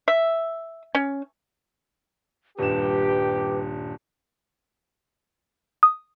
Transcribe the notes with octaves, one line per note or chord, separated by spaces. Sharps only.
E5
C#4
D#1 G2 G4 B4 E7
D#6